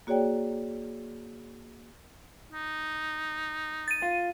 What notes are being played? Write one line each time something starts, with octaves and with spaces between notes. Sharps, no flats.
A#3 F#4 G#4 C#5 D5 G5
D#4
A6 D#7
F4